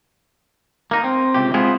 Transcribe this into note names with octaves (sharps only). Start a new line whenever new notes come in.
A#3 D#4
C4
C#2 C3 G4
G#3 B3 C4 E4 F4 G#4